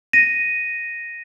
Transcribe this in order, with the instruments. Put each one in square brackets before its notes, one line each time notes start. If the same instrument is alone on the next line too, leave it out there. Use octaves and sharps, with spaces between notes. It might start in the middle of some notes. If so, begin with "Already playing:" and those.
[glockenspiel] A#6 D#7